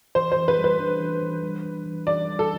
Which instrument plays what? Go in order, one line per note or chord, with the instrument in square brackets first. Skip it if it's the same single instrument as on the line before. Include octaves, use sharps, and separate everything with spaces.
[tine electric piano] E3 [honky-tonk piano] C5
[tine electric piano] E3 [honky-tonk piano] C5
[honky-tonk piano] B4
[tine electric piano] G3
[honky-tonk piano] B4
[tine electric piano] D4
E3
E3
G3
D4
E3
[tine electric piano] E3 [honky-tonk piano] D5
[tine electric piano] G3
[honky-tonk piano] A4